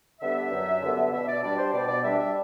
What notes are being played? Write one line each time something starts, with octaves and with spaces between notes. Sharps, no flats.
D3 G3 B3 D4 E5
F#2
D3 G3 B3 D4
B2 E5
D5
G3 D4 D5
C5
B2 D5
D5
G3 D4 E5
E5